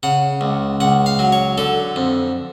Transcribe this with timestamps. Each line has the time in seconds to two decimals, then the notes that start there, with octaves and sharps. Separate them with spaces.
0.03 C#3 F#5
0.41 C#2
0.80 C#2 F#5
1.06 F5
1.19 F#3
1.32 C#5
1.58 D3 A4
1.96 F2